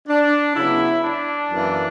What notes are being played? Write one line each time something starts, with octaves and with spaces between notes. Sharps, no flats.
D4
C#3 F#3 B3 E4
D4
F#2 E3 A#3